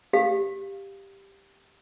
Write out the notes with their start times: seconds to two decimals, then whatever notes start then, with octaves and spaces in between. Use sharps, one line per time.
0.13 G4 F5